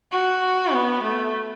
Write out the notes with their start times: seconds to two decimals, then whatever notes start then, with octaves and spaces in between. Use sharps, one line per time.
0.12 F#4
0.74 B3
1.03 A3